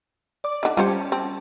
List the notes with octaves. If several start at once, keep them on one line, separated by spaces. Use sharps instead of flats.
D5 D6
D3 D#3
G3 C#4 F4 G4 C5 A5
C4 A5